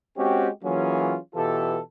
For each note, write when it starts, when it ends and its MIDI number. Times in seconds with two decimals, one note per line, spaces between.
0.16 0.48 56
0.16 0.48 60
0.16 0.48 61
0.16 0.48 66
0.16 0.48 67
0.64 1.17 52
0.64 1.17 54
0.64 1.17 58
0.64 1.17 61
0.64 1.17 65
0.64 1.17 68
1.35 1.79 47
1.35 1.79 52
1.35 1.79 65
1.35 1.79 67
1.35 1.79 69